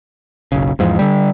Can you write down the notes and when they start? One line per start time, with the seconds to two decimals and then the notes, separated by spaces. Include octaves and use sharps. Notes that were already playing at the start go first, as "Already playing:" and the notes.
0.52 F#1 B1 C#3
0.79 E2 G#2 F3
0.99 D3 G3